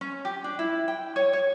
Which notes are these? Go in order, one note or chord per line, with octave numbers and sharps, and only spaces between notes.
C#4
G4
D4
E4
G5
C#5
C#5